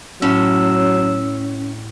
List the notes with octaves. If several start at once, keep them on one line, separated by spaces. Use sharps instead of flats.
A2 F#3 C#4 E6